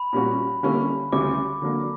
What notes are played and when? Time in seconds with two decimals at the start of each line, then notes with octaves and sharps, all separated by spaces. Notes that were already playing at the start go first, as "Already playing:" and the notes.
Already playing: B5
0.13 A#2 G3 C#4 F#4
0.63 D3 G3 A#3 C#4 E4
1.12 D2 C#3 G3 C#4 E4 D6
1.62 D3 F#3 A#3 D4